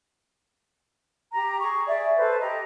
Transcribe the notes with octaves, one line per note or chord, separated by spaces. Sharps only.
G4 A#5
G#4 C#6
G#4 D5 E5
A4 B4 C5
G4 D#5 A#5